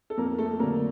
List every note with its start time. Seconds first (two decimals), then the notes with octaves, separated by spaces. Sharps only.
0.10 A4
0.17 F2 A#3 A#4
0.38 A3 A4
0.59 F#3 A#3 A#4
0.63 D3